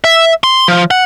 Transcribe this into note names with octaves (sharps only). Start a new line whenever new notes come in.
E5
C6
F3
F#5